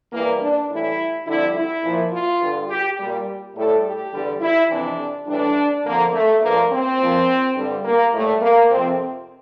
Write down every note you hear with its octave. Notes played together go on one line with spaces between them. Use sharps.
E2 E3 G3 A#3
D4
A2 E3 G3 E4
F2 D3 G3 E4
E4
A#2 F3
F4
G2 D3 G3
G4
A#2 G3
A2 G3 A4
G4
E2 D3 G3
E4
F2 C3 E3 D4
A2 E3 G3 D4
F2 D3 F3 A#3
A3
G2 F3 A#3
C4
A#2 F3
G2 D3 G3
A#3
A2 G3 A3
A#3
F2 C3 F3 C4